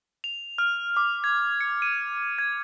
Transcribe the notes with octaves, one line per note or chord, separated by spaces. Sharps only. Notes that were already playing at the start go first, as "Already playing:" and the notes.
F7
F6
D6
G#6
C#7
D#7
G#6